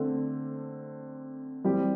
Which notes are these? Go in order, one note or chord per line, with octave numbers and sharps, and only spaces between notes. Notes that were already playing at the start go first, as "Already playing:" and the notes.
Already playing: D3 A3 C4
E3 G3 C4 G4